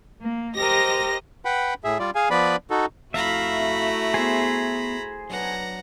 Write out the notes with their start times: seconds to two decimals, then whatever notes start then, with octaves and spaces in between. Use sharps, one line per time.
0.22 A#3
0.57 G4 A#4 C5 D#5 A#6
1.45 B4 F#5 G5 B5
1.84 A2 G#4 E5
1.99 G3 F4 D5
2.15 G#4 F5 G#5
2.30 F3 B3 B4 D5 B5
2.70 D#4 F#4 A4
3.14 F2 A3 E4 F#4 E5 F5 A#5 B5
4.14 B3 G#4 C5 G#5
5.30 F#3 D4 B4 F#5 A#5